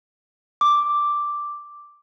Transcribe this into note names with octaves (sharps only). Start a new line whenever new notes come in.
D6